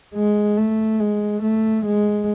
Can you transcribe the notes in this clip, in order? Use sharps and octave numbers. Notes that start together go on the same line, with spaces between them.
G#3
A3
G#3
A3
G#3